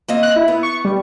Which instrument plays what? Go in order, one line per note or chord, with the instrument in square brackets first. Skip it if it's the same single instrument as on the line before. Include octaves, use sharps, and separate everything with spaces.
[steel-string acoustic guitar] A#3 C4 D#5
[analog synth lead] F#6
E4
[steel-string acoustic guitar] B3
[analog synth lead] C#6
G3